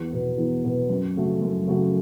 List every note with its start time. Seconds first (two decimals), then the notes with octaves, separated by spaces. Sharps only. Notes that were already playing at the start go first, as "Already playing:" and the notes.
Already playing: E2
0.12 B2 B3
0.37 E2
0.64 B2 B3
0.90 F#2
1.16 C#3 A3 F#4
1.42 F#2
1.67 C#3 A3 F#4